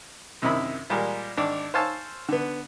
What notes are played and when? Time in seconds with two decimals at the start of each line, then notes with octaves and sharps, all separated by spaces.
0.42 F#2 C3 D#3 E4 D#5 B5
0.90 A#2 G3 G#3 A#4
1.37 G#1 D4 D5
1.74 C5 C#5 F5 G#5 A5 E6
2.29 D3 B3